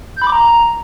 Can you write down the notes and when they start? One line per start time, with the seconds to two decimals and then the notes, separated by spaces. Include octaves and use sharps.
0.16 G6
0.22 B5
0.27 D6
0.32 A#5